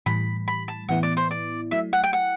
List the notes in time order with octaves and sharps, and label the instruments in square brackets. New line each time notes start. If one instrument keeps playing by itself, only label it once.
[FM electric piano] A2 E3 G3 [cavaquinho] B5
[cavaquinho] B5
A5
[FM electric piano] A2 E3 B3 E4 [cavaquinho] F#5
[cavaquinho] D5
C5
D5
[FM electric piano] F#3 A3 E4 [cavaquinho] E5
[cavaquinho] F#5
G5
F#5